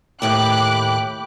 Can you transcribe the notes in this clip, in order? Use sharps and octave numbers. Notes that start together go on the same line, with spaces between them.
D#2 A2 G4 G5 B5 D6 F#6